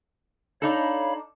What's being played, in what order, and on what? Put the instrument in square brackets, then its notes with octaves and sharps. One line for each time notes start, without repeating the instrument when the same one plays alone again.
[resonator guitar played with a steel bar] D4 D#4 A4 [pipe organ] C#5 F5 B5